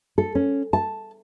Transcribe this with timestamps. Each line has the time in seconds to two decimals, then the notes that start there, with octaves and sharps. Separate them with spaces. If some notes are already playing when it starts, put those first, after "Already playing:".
0.18 A4
0.35 C#4
0.73 A5